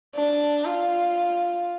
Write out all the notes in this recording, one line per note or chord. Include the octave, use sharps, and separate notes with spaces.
D4
F4